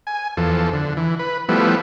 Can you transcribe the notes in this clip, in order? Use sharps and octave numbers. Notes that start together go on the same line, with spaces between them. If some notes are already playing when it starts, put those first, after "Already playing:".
G#5
E2 F3 A4
D3
E3
B4
F3 G3 A3 B3 E4